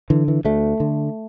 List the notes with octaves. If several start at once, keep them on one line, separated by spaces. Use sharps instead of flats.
D3 E3
E3
D2 A3
D3